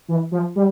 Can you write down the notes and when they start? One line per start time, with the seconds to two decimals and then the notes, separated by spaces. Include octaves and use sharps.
0.08 E3
0.32 F3
0.56 G3